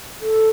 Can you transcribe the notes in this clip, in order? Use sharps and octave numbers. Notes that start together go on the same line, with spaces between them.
A4